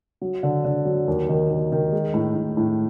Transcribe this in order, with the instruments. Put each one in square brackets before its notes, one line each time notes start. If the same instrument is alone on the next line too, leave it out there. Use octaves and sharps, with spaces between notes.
[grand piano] F#3
D3
D3
F#3
D#2
D#3
D#3
D#3
G#3
A2
A2
A2